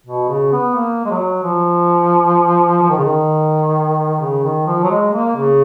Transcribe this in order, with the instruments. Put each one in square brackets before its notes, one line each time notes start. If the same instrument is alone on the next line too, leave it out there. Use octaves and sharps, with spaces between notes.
[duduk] B2
C#3
B3
A#3
G#3
F#3
F3
F3
D#3
C#3
D#3
C#3
D#3
F3
F#3
G#3
A#3
C#3